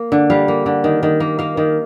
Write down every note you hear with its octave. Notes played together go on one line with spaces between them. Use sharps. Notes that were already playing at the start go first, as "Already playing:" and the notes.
Already playing: A#3
D3
G3 F5
A#3
D3
D#3
D#3
A#3
A#3 F5
D#3